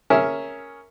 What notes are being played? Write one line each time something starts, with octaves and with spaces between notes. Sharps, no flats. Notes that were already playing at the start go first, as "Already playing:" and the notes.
C#4 G#4 A#4 E5